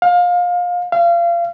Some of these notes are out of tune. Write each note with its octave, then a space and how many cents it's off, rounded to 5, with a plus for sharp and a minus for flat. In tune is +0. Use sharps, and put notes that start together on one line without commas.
F5 +25
F5 -30